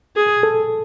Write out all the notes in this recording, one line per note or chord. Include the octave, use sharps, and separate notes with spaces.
G#4
A4